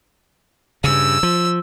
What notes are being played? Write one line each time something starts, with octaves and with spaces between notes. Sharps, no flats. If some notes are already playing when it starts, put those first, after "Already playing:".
G2 C#3 E6
F3